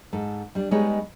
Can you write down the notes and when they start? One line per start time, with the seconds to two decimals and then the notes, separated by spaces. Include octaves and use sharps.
0.13 G#2 A4
0.55 G3 D4
0.71 G3 G#3 B3 D#4 G#4 C#5